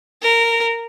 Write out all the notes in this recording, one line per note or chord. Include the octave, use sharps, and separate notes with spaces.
A#4